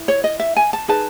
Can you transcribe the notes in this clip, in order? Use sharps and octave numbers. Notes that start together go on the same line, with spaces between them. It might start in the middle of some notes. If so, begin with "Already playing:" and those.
Already playing: E4
C#5
D#5
E5
G#5
A5
D#4 G#4 B4 A5